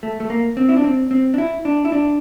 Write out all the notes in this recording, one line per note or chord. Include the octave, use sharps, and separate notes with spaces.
A3
A3
A#3
C4
E4
D4
C4
C4
D4
E4
D4
E4
D4